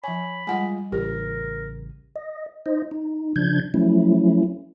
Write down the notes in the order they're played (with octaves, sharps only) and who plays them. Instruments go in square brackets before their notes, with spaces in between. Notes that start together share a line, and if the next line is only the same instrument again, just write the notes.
[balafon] F3 G#5 [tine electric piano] C#5 [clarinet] B5
[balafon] G3 F#5 G#5 [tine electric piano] G#3 F4 D#5
[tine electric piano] A1 C#3 [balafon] G4 [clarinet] A#4
[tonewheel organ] D#5
D#4 C5 D#5
D#4
C#3 F3 D4 G6 G#6
F3 F#3 A3 C#4 E4